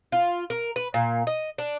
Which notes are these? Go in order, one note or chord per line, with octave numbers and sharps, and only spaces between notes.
F4
A#4
B4
A#2
D#5
D4